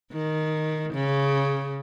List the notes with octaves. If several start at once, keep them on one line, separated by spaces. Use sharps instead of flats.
D#3
C#3